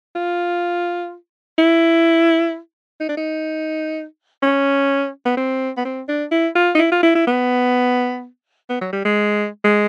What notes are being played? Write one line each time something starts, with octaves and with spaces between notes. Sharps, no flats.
F4
E4
D#4
D4
D#4
C#4
B3
C4
B3
C4
D4
E4
F4
D#4
E4
F4
E4
E4
B3
B3
F#3
G3
G#3
G#3